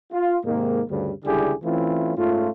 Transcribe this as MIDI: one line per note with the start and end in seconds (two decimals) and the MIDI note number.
0.12 0.38 65
0.45 0.82 44
0.45 0.82 48
0.45 0.82 51
0.45 0.82 56
0.45 0.82 58
0.90 1.12 38
0.90 1.12 43
0.90 1.12 49
0.90 1.12 55
1.25 1.53 37
1.25 1.53 50
1.25 1.53 55
1.25 1.53 64
1.25 1.53 67
1.25 1.53 68
1.63 2.15 52
1.63 2.15 57
1.63 2.15 60
1.63 2.15 61
1.63 2.15 64
1.63 2.15 65
2.17 2.50 44
2.17 2.50 57
2.17 2.50 61
2.17 2.50 65